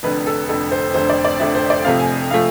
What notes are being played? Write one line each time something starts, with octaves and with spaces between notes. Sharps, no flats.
F1 F2 D3 B4
A4
F1 F2 D3 A4
C5
F1 F2 D3 C5
D5
D5
F1 F2 D3 E5
C5
D5
F2 C3 F3 A3 F5
G#5
C3 F3 A3 F5